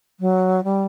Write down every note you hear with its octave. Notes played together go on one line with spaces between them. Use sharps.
F#3
G3